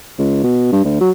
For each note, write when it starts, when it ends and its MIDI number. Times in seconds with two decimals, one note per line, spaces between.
0.18 0.40 37
0.44 0.71 47
0.72 0.82 43
0.84 0.97 38
1.01 1.10 54